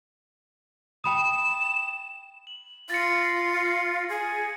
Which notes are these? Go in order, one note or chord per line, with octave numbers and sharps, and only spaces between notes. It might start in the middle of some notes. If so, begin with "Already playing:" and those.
G5 B5 D#6 E7
F#7
F4 A6 A#6 C#7
G#4